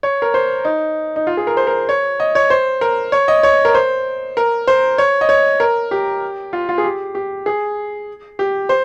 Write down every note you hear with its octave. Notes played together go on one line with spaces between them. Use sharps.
C#5
A#4
C5
D#4
D#4
F4
G#4
A#4
C5
A#4
C#5
D#5
C#5
C5
A#4
C#5
D#5
C#5
A#4
C5
A#4
C5
C#5
D#5
C#5
A#4
G4
F4
F4
G#4
G4
G4
G#4
G4
C5